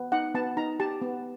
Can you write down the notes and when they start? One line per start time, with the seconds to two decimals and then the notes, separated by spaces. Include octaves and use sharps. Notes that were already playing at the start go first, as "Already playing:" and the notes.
Already playing: B3
0.12 D#4 F#5
0.35 B3 A5
0.57 D#4 A#5
0.80 G4 A5
1.02 B3